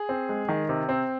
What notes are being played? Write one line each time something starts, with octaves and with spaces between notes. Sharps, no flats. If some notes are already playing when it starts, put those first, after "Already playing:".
Already playing: G#4
C4
G#3
D#3
C3
C4